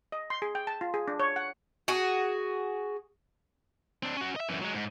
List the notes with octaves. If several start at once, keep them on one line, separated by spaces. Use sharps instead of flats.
D#5
C6
G#4
G5
A5
F4
G#4
D4
C#5
F#5
F#4 G#4
C4 D4
C#4 F#4
D#5 E5
F#2 E3
F#3 G#3
G#2